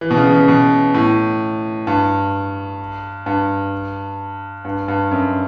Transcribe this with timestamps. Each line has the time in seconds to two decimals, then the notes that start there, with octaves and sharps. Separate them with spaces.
0.01 E3
0.11 B2
0.17 C#3
0.32 C#3
0.48 B2
0.94 A2
1.87 G2
3.26 G2
4.65 G2
4.88 G2
5.11 F#2